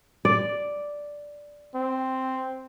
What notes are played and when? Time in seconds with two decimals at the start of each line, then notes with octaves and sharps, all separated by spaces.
0.25 D5
1.75 C4